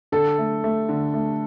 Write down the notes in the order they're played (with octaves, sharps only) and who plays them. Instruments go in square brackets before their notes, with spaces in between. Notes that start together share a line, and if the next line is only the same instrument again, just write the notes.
[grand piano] D3 [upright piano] A4
[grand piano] A3
A3
D3
A3